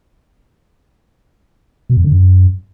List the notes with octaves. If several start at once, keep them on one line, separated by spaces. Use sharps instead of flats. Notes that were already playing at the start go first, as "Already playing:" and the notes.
B2
F2
D3
F#2